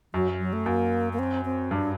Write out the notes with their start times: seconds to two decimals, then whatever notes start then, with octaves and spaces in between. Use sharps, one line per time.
0.14 F#2 F#3
0.40 F#3
0.53 A3
0.66 F#2 A#3
1.13 A#3
1.19 C4
1.45 C4
1.71 G2 D4